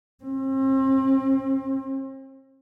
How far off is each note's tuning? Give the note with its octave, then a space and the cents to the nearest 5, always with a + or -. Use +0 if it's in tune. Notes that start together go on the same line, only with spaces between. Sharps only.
C4 +35